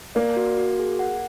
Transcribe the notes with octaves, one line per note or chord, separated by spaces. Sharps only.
A#3 D5
F#4
F#4
G#4
F#5